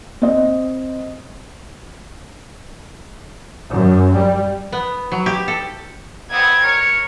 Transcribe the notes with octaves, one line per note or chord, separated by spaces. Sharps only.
C4 D#5
F#2
G3
B3
F#3
G4
A4
B3 C4 G#6
A#4 C#5